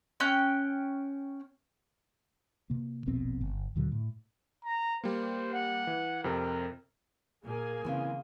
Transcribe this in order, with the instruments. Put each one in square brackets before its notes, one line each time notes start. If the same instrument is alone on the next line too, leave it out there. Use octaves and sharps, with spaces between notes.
[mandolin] C#4 G5 F#6
[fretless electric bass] C3 A#3
E1 A#1 B2 C4
G1
D2 A#2 D3 F#3
A2
[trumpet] A#5
[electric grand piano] G3 A#3 [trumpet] C5
[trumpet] F#5
[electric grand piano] E3
[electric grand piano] F2 C3 C4 [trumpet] A#4
[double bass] A#2 [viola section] A#3 G#4 G#5
[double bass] C#3 [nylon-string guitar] E3 C4 [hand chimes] F5 C6